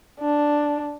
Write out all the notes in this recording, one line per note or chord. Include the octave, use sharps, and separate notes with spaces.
D4